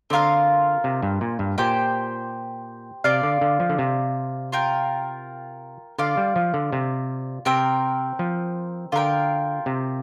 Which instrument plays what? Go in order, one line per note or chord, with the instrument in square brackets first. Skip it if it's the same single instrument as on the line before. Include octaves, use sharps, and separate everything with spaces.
[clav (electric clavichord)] D3 [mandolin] C4 F4 A#4 F5
[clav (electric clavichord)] C3
G2
A#2
G2
[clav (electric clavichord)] A#2 [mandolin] G4 C5 G5
[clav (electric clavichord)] C3 [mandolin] F4 D5 F5
[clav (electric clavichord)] D3
D3
F3
D3
C3
[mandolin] F4 A#4 G5
[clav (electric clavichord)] D3 [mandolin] F4 D5 F5
[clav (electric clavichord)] G3
F3
D3
C3
[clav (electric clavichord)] C3 [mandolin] C4 A#4 G5
[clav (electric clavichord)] F3
[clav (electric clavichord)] D3 [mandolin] F4 A#4 G5
[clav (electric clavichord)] C3